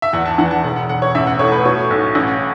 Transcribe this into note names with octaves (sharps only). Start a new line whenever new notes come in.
E5
E2 F#5
A5
E3 F#5
A5
E1 F#5
F#5
E1 F#5
C#5
A1 E5
F#5
A2 C#5
B4
B2 C#5
B1
A1